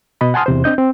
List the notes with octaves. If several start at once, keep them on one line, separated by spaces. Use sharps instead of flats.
B2 D#5 B5
F#5 G#5 A5 C6 D#6 F6
E2 C3 C5
C4 D4 D#5 G6
C4